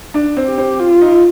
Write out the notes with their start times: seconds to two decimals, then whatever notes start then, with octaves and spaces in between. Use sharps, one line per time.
0.14 D4
0.37 C4
0.47 G4
0.58 C4
0.80 F4
1.01 D#4